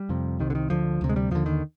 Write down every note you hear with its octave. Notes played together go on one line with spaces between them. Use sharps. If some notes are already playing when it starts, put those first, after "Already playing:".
Already playing: G3
F2 C3
C2 C3 D#3
D3
D#3
D2 D3 F3
D2 C3
G#3
G3
D#2 D3 F3
D#3